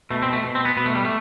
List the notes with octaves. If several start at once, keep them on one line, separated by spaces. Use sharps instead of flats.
B2 A3
C4
A3
B2
C4
B3
B2 B3
A3
G3
A3